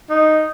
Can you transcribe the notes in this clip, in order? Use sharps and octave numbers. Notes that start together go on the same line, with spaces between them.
D#4